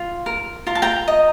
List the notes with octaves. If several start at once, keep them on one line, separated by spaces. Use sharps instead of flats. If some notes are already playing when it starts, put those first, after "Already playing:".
Already playing: F4
A#4
F4 A#5
A5
G5 A#5
D#5